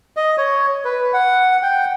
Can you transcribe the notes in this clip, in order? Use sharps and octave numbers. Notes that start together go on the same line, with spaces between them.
D#5
C#5
B4
F#5
G5